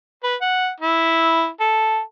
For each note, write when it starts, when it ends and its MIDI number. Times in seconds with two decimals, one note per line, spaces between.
0.24 0.35 71
0.41 0.69 78
0.80 1.49 64
1.60 2.00 69